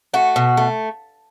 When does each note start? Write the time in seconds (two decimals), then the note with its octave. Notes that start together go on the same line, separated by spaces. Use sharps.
0.14 A3 F#4
0.36 B2
0.57 A3